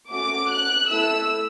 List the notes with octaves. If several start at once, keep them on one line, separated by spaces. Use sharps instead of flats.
A3 C#4 F#4 A4 D6
F#6
A3 E4 A4 E6